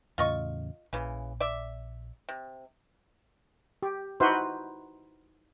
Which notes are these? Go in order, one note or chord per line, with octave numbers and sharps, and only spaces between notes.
E2 A2 C#3 F4 D#5 C#6
A#1 C#3 E3
D5 E5
C3
G4
D#4 E4 F#4 B4 C5